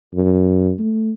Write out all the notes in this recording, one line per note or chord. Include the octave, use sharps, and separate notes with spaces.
F#2
A3